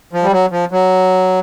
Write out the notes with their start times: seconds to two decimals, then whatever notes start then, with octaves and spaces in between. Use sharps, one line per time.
0.13 F3
0.23 G3
0.32 F#3
0.51 F3
0.72 F#3